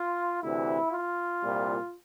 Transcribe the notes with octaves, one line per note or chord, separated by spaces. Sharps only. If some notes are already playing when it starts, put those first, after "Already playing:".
Already playing: F4
D2 C3 E3 E4
F4
C2 A#2 G3